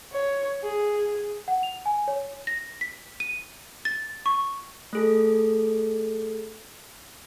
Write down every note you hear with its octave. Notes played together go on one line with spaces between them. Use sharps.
C#5
G#4
F#5
F7
G#5
C#5
A#6
B6
D#7
A6
C#6
A3 G#4 A4